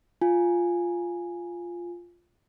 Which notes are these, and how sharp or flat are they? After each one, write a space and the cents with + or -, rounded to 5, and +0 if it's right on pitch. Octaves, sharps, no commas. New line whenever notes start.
F4 +0 G#5 +0